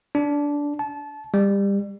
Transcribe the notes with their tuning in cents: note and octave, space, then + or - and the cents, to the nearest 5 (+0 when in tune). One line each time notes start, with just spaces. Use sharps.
D4 -15
A5 -25
G3 +25